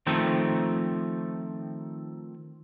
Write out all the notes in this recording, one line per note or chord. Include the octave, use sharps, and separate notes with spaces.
D#3 F3 A3 C4